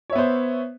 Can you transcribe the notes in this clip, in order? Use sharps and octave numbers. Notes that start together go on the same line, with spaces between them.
B3 C5 C#5 E5